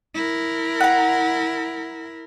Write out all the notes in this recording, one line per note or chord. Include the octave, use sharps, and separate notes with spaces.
E4 A#4
F#5 A#5